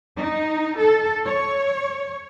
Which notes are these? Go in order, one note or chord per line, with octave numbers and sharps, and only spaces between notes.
D#4
A4
C#5